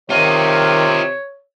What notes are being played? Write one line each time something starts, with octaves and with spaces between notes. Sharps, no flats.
C3 D#3 F4 C#5 D#5